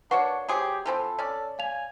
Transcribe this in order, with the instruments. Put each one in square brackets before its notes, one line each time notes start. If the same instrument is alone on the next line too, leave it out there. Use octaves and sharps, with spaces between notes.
[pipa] A#3 F#4 C#5 [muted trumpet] D4 [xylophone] B4 F#5 C#6
[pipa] F#3 C4 G#4 [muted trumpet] G4
[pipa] E3 F3 C4 [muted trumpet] A4
[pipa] C#4 D5
[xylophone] F5 F7 [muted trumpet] G#5